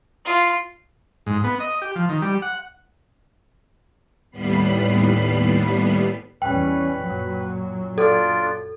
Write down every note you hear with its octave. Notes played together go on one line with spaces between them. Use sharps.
F4
G#2
B3
D#5
G4
F3
D#3
G3
F#5
D#2 A2 G3 B3 B5 C7
E2 G3 C#4 B4 G5
F#2 A#2 F#3
D4 F4 A4 D5